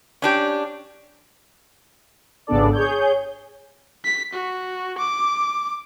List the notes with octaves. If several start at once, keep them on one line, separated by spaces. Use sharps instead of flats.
C#4 D4 G4
G#1 C#3 B3 D4 A4 D5
G#4 C#5 G6
B6
F#4
D6